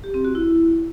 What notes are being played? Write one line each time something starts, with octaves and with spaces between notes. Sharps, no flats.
G4
C4
F#4
E4